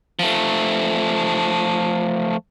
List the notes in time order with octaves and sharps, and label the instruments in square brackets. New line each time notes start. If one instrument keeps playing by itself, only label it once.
[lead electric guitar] F3 A3